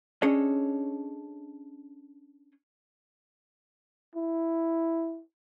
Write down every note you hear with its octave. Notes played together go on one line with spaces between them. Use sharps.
C#4 D4 G#4 A4 C#5 D#5
E4